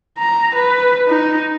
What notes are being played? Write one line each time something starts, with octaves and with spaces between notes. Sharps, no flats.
A#5
B4
D#4